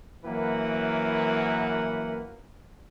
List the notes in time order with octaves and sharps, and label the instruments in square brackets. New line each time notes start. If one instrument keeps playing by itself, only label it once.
[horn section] F#2 E3 A#3 B4 F#5